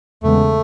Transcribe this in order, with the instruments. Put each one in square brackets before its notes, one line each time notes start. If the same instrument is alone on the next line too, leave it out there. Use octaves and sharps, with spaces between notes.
[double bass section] E2 C#3 G#3 B3 [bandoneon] A3